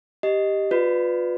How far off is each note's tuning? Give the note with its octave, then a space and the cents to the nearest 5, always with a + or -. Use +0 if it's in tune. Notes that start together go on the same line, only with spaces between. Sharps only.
G4 +0 D#5 +0
F4 +30 B4 +10 D5 +25